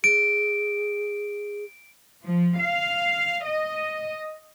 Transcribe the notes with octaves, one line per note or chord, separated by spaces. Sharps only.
G#4 D7
F3
F5
D#5